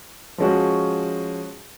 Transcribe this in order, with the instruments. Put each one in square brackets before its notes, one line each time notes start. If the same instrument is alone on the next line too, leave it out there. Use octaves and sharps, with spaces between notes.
[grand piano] F3 G#3 C#4 F#4